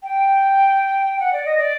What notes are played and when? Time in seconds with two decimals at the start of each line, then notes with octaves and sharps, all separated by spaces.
0.03 G5
1.20 F#5
1.33 D5
1.45 D#5
1.58 D5